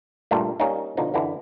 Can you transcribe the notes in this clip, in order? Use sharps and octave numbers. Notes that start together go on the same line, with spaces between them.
G2 A#2 G3 A3
G3 A#3 C#4 D#4
B2 D3 F3 D#4
F#2 D3 E3 E4